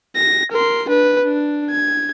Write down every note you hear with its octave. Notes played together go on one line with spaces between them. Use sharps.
A#6
A#4 C6
D4 B4
D4
G#6